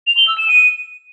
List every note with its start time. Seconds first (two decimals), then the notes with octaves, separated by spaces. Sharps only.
0.07 F7
0.17 G7
0.28 E6
0.38 E7
0.48 D#7